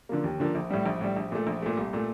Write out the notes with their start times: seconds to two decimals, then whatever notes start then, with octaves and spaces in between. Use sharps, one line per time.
0.09 D3 F3 A#3
0.24 D#2
0.40 D3 F3 A#3
0.55 A#1
0.70 A2 G3
0.86 A#1
1.01 A2 G3
1.16 A#1
1.32 A#2 A3
1.47 A#1
1.62 A#2 A3
1.77 C2
1.93 A#2 A3